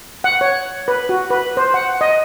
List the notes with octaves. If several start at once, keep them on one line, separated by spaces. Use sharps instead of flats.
F#5
C#5
B4
F#4
B4
C5
F#5
D#5